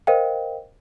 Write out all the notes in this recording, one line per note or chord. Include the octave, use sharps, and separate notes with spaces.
A#4 C5 D#5 F5 G5